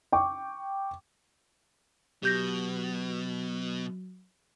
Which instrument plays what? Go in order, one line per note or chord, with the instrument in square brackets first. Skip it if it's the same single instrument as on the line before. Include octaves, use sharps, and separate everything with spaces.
[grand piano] G5 C#6 D6
[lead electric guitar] B2 [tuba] F#3 [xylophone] G4 G6 A#6